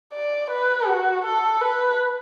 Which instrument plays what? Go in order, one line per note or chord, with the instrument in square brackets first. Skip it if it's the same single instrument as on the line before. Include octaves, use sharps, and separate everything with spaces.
[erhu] D5
B4
F#4
A4
B4